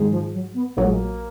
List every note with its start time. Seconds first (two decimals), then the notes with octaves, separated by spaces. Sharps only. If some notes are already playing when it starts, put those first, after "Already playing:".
Already playing: G#2 D#3 G#3 D#4 G#4
0.10 F3
0.32 F#3
0.54 B3
0.77 A#1 A#2 F#3 A#3
0.85 G#3
0.93 A#3